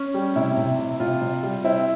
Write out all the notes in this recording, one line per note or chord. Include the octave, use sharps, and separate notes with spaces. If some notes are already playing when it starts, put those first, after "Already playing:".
Already playing: C#4
G3
C3 E4
C3
C3
C3 F4
C3
G3
C4 E4